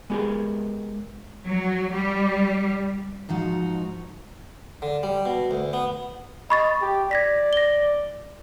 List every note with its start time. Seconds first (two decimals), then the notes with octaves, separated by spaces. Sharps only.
0.10 G#3 B3 G4 G#4 A#4
1.45 F#3
1.92 G3
3.29 G#2 F3 D#4 F#4
4.82 D3
5.03 G3
5.26 B2
5.51 D2
5.73 B3
6.50 D#5 B5 C#6 A6
6.82 G4
7.11 D5 G#6 A#6 B6
7.53 A#6 G7